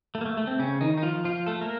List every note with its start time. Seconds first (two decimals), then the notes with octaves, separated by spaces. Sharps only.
0.15 A3
0.21 A#3
0.26 A3
0.37 A3
0.47 C4
0.59 C#3 C#4
0.81 D#3 D#4
0.98 D#4
1.03 F3 F4
1.24 F3 F4
1.46 A3 A4
1.61 A#3 A#4